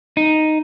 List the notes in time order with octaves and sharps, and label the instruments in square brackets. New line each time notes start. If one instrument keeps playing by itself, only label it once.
[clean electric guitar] D#4